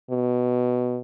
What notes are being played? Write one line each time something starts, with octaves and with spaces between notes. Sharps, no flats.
B2